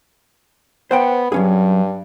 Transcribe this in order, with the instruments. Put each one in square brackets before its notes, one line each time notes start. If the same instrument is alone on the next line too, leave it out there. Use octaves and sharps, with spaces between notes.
[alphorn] B3 [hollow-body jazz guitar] C5 F#5 G5
[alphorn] G2 [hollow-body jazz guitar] F#3 C#4 G#4